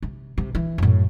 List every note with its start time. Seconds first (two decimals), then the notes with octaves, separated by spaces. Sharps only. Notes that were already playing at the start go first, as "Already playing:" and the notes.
0.02 C3
0.38 C3
0.55 E3
0.78 F#2 A2